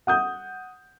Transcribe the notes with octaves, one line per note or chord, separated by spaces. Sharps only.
F#5 D#6 G6